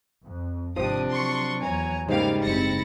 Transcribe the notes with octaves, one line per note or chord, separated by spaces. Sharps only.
F2
G#1 C3 F3 D4 G4 D#6
F#3 C6 C#6
E2 C#5 G#5 A#5
G#2 C#3 G3 A#3 G4 F5
F#1 C4 E4 A6 A#6 C#7